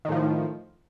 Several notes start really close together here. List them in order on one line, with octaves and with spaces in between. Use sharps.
D#3 A2 F3